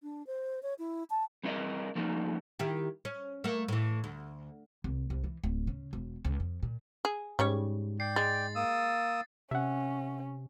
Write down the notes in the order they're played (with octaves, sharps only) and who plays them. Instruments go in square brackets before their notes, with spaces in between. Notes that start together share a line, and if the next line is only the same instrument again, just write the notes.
[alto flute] D4
C5
C#5
E4
A5
[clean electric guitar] G3 C4 E4 A#4 D#5
F3 G3 A3 A#3 D#4
[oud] D#3 E4 G4
C#4
A3 A#3
A2 E3
D2
[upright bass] C2
C2
E3
D1
C#3
E1
C#2
F2
A#2
[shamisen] G#4
[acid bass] G#2 [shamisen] C#3 G3 C#5
[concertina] D5 G5 [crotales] C7
[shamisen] G#3 [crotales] A6
[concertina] A#3 D#6 E6
[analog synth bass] C3 [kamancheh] C#4 [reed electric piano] E5 F#5